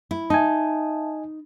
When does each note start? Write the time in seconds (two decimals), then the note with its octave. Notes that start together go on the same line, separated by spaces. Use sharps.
0.11 E4
0.30 D#4 D#5 E5 G#5 A5